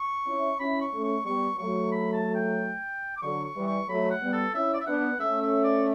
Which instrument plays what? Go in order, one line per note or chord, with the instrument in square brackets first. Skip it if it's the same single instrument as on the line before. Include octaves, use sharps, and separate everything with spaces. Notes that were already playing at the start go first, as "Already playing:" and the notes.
Already playing: [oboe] C#6
[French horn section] C#4 E4
[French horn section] C#4 E4 [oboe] B5
[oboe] C#6
[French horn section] A3 C#4
[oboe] C#6
[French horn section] G3 B3 [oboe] C#6
[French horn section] F#3 A3 [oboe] C#6
[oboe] B5
A5
G5
D6
[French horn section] D3 F#3 [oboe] C#6
[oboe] C#6
[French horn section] E3 G3
[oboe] C#6
[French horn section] F#3 A3 [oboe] B5
[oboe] F#5
[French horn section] G3 B3
[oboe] A4
[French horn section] C#4 E4 [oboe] E5
[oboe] D5
E5
[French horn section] B3 D4 [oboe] F#5
[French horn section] A3 C#4 [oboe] E5
[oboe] E5
D5